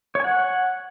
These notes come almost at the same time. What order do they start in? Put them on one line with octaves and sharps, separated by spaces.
C#5 G#5 F#5